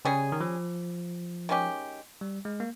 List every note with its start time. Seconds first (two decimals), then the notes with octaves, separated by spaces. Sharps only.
0.05 C#3 G3 C#4 G#4
0.32 D#3
0.41 F3
1.49 D#3 G#3 C#4 G4
2.21 G3
2.45 G#3
2.60 A#3